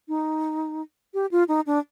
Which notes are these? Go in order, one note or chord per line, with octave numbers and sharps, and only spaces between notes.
D#4
G4
F4
D#4
D4